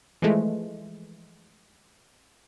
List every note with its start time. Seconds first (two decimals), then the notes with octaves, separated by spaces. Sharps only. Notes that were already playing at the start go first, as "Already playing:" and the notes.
0.22 E3 F3 G#3 A3